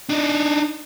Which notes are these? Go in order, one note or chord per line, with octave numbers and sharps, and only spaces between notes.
D4 D#4